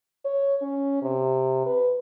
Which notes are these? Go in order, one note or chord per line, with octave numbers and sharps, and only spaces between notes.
C#5
C#4
C3
B4